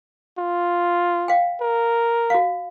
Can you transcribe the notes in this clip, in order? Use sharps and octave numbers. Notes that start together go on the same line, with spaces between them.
F4
F5 G5
A#4
F#4 F5